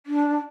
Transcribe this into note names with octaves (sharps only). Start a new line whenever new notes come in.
D4